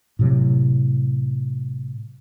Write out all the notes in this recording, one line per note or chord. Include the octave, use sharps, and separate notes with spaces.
A2 C3 F#3